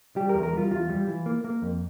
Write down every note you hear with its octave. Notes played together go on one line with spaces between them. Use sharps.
G3 G4
A#4
E2
A#4
G3 F4
E2 F4
G3
E3
A#3
A#3
F2